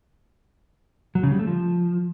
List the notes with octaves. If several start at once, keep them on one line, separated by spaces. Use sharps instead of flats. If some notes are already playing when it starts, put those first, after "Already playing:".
F#3
C#3
G3
A3
F3